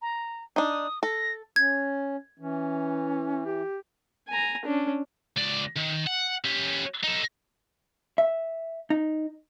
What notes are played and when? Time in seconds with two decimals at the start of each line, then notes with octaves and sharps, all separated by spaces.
0.02 A#5
0.56 D4 D#4 D#6
1.03 A4 A#6
1.56 C#4 G#6
2.40 E3 C#4
3.46 G4
4.28 G#5 A#5
4.66 C#4 D4
5.37 C#2 D5
5.77 D#3
6.07 F#5
6.45 C#4 G4
7.03 D#4 A4
8.18 E5
8.90 D#4